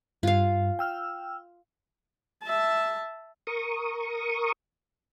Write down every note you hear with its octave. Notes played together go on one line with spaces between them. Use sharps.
G2 F4 F5
G5 E6 F6
E5 A5
A#4 C#6 D#6